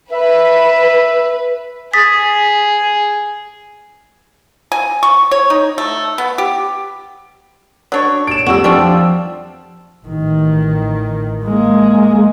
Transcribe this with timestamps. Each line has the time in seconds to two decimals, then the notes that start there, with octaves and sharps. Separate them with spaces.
0.12 B4 E5
1.94 G#4 D#6 A6 B6
4.72 G#5
5.03 C#6
5.31 C#5
5.50 D#4
5.78 A3
6.18 B3
6.38 G4
7.92 F#3 D4 C#5
8.27 D7 E7
8.46 F2 G3 F#4 E6
8.64 F3 G3 C4 D4 F4
10.06 A1 D#3
11.45 G#3 A#3